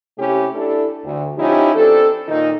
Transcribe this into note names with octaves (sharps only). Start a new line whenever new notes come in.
C3 A3 C#4 E4 G4
D4 E4 A4
D2
F3 C#4 D#4 E4 G4
C4 D4 A4
A#2 D#3 D#4